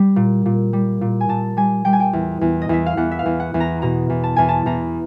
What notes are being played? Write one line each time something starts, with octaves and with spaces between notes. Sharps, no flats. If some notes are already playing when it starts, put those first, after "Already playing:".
Already playing: G3
A#2
A#2
G3
A#2
G#5
A#2 A5
G3 G#5
G3 G5
G#5
G5
E2
E2
D#5
E2 E5
F5
E2 F#5
E5
F5
E2
F#5
E2
A#5
B2 A#5
E2
A5
E2 G#5
A5
E2 A#5